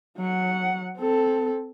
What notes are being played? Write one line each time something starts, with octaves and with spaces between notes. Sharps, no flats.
F#3 F#5
C4 A4